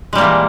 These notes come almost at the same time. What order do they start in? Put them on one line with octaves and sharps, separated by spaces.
G#3 G3 A#3 E3 A#2